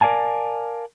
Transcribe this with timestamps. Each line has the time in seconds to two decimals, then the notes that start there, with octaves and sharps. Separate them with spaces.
0.01 A#4 D5 F5 G#5 A5